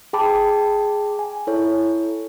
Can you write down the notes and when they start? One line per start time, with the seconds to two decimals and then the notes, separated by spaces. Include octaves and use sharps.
0.13 G#4 G5 A5 B5 D6
1.19 G#5
1.47 E4 A4 C#5